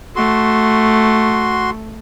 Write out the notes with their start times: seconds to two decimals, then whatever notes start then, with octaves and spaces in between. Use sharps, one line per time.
0.16 A3 F#4 C6